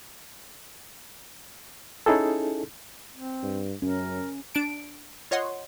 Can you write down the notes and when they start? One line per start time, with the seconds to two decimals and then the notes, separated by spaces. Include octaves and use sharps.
2.06 C#4 D#4 E4 G#4 A4
3.14 C4
3.43 G2
3.82 F#2 C#4 A#4
4.55 D4 A5 D7
5.31 F4 C#5 D#5 F#5 C6